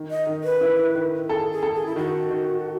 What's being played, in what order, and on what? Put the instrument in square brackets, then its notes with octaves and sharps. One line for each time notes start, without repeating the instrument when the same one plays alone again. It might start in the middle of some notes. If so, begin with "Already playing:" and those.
Already playing: [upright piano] D#3
[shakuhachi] D#5
[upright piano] D#3
[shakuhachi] B4
[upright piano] E4
D#3
[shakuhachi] G#4 [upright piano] A4
[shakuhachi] G#4
[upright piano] A4
[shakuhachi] G#4
E4
[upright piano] D#3 [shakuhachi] F#4
[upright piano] D#3